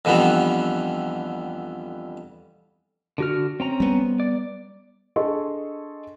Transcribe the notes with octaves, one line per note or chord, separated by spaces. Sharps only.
F2 D3 E3 G3 B3
D3 F#4 F6
C4 C#4 A#5
G3 B3
D5
D4 G#4 A4 D#5 C6 C#6